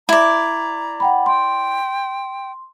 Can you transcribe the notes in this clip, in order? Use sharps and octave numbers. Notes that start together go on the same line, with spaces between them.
E4 D5 A#5
F#5 G5 B5
G5 C6